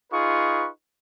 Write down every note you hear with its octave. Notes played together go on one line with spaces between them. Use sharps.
D#4 F4 G#4 B4 C#6